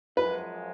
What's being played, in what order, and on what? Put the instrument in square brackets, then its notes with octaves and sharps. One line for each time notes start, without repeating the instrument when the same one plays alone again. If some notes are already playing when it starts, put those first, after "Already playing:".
[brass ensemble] F#2 F3 G#3 [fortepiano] B4